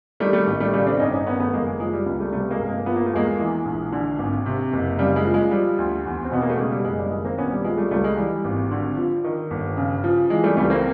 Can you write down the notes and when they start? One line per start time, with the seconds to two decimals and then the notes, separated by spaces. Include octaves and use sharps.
0.20 D#3 G3 A3
0.33 G3 A3
0.47 A1
0.60 G3 A3
0.73 C#3 G3 A3
0.87 C4 D4
1.00 G1 C#4 D#4
1.13 C#4 D#4
1.26 D#3 B3 C#4
1.40 A3 B3
1.53 F#1 G#3 A#3
1.67 G#3
1.80 F3 G#3
1.93 G3
2.06 C#2
2.20 G3 A3
2.33 C3 G3 A3
2.51 G#3 A#3
2.59 G1
2.68 G#3 A#3
2.86 F3 B3
2.96 A#3
3.06 A3
3.13 E2 G#3 A#3
3.39 E3 G#3
3.65 A#1
3.92 D3
4.19 G#1
4.46 C3
4.73 F#1
4.99 C#3 G3
5.16 G#3
5.25 F3
5.34 G#3
5.51 F3 G3
5.78 D2
6.05 E2
6.25 C4
6.32 B2 B3
6.42 A#3
6.50 A3
6.58 C#3 G#3
6.71 G3
6.84 F#1 G#3
6.98 G3
7.11 D#3 G#3
7.25 A#3 C4
7.38 A#1 B3 C#4
7.51 G3
7.64 F3 G#3
7.78 G3 A3
7.91 C#2 G3 A3
8.04 G#3
8.17 E3 G3
8.44 G#1
8.71 D3
8.97 F3
9.24 D#3
9.51 G1
9.77 C#3
10.04 F3
10.30 E3 G#3
10.44 G3 A3
10.57 C#2 G3 A3
10.70 A#3 C4